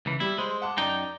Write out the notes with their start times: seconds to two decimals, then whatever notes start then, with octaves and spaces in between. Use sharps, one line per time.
0.06 C#2 E3
0.20 G3 E4
0.38 G#3 C5
0.62 F#5 A5 D6
0.78 F#2 D#4 D5 G5 A#5